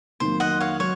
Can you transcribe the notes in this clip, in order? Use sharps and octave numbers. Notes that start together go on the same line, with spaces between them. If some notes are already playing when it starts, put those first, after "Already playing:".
F2 D#3 F#3 A#3 C5
D#5 F#5
C#5 F5
F#3 C#5